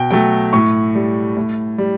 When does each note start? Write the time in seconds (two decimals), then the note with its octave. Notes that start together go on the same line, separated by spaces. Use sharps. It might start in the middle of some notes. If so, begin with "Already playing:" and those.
Already playing: B2 G5
0.11 F#3 A3 G5
0.53 A2 C#6
0.95 G3
1.37 A2
1.78 G3